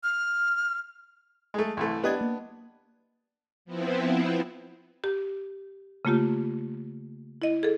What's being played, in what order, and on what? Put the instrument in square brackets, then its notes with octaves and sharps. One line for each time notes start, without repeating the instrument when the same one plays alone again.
[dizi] F6
[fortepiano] G#3 A3
C2 E3 A3
[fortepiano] B3 D4 [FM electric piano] G4 D#5 G#6
[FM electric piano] A#3
[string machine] F3 B3 C4 E4
[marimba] G4
C#3 A3 A#3 F4 G4
E4 D#5
G#4 A4